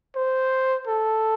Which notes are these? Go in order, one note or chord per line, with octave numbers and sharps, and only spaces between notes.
C5
A4